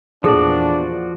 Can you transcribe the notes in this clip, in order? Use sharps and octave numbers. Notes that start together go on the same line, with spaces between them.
E2 A#2 F3 D4 F#4 G#4 A4 D5